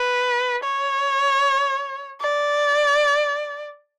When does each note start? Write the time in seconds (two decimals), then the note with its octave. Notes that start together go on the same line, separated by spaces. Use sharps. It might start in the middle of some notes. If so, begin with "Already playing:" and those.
Already playing: B4
0.63 C#5
2.21 D5